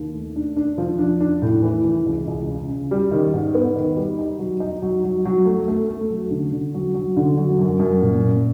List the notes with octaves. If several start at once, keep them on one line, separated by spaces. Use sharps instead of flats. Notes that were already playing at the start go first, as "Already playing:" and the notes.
Already playing: D#2
A3
D4
D4
F3
D4
D4
A2
E3
E3
C#2
C#2
C#3
C#3
G3
D#3
G#2
B3
D#3
G3
D#4
F#3
D#4
F#3
F#3
F#3
A3
A3
A3
F#3
D3
D3
F#3
F#3
D3
F#3
F#2
F#2
A#2
A#2